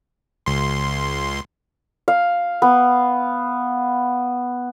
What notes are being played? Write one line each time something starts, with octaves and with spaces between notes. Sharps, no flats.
C#2 C6
F5
B3